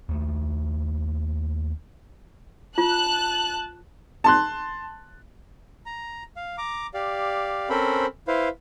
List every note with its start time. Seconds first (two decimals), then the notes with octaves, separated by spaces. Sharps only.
0.09 D#2 A3
2.78 F4 A5 F#6
4.24 A5 C6 F#6
5.86 A#5
6.36 F5
6.58 A#5 D6
6.94 G4 D5 F5
7.70 C4 C#4 A4 A#4 C5 B5
8.28 E4 B4 C5 F5